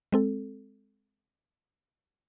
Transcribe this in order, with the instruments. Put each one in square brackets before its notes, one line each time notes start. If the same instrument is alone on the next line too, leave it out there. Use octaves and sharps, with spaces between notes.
[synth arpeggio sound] G#3 C4 A4